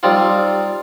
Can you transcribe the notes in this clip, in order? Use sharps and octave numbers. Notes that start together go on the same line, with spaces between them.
G3 C4 D#4 F4